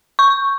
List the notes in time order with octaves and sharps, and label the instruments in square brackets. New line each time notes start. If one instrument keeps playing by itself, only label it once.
[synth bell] C#6